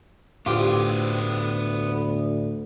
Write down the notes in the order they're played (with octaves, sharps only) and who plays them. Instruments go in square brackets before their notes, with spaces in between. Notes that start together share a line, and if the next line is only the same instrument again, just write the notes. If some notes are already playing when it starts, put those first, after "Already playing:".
[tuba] D2 [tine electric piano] A2 [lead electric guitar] B3 C5 [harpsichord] F4 G4